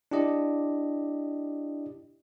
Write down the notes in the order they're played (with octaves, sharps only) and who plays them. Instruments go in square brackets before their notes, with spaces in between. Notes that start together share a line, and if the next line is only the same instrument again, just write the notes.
[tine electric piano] D4 E4 G4 D#5